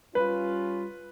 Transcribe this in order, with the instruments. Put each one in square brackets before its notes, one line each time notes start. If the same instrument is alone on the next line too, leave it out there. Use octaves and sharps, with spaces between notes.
[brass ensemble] G3 C#4 F4 [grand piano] B4